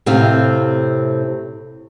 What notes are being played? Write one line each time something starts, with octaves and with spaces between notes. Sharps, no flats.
A2 C3 C4 F5